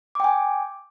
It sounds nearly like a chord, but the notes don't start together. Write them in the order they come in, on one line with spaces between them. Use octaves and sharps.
D6 G5 G#5